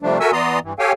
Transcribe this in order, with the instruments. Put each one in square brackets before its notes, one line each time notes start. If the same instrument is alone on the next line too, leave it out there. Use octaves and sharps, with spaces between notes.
[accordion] C3 F3 G3 A3 D4
F#4 A4 A#4 E5 G#5 E6
E3 B3 D5 A#5 C6 D#6
G2 E3
G4 A4 C#5 F5 G5 G#5